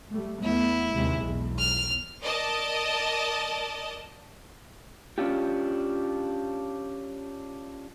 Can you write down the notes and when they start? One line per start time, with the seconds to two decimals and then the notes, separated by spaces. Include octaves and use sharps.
0.12 G3 A3
0.43 E2 A3 B3 E4
0.94 D#2 C3 G#3
1.22 B1 E2
1.58 F6
2.22 A#4 D5 D#5 A5 D#6
5.18 C#4 D4 F4 G4